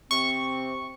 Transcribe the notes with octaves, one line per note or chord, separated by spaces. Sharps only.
C3 C4 C#6